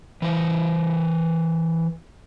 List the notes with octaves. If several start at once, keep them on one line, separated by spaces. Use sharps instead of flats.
E3 C5